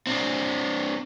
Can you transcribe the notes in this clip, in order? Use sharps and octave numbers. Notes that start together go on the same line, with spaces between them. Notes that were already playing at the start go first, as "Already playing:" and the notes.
C4 D4